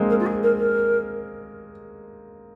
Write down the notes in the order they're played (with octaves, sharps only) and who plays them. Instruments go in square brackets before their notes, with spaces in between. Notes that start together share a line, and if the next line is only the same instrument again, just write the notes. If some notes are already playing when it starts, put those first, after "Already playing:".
Already playing: [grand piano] G#3 A#3 C4
[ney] A#4
F4
G#4
A#4
A#4